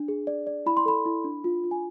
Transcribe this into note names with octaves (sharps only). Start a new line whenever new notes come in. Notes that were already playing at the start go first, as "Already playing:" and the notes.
Already playing: D4
G#4
D5
D5
E4 B5
C6
A4 B5
E4
D4
F4
F4
G#5